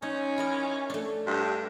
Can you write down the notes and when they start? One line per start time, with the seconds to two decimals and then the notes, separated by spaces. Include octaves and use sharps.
0.02 C#4 D#4
0.38 E4 A#4 D#5
0.90 A3 D4
1.27 G2